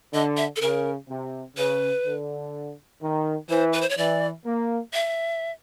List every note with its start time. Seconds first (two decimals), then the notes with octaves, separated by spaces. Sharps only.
0.13 D3 D#5
0.37 E5
0.56 A4
0.61 C#3 A#4
1.09 C3
1.57 C#3 B4
2.06 D3
3.02 D#3
3.50 E3 C5
3.73 B4
3.81 C5
3.89 C#5
3.97 E3 D5
4.45 A#3
4.94 E5